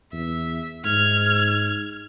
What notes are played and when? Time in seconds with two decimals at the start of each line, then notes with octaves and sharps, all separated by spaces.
0.13 E2 E5
0.85 G#2 F6 G#6